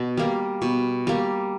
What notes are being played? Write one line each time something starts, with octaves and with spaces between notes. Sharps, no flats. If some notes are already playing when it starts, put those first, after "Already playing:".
Already playing: B2
G3 A#3
B2
G3 A#3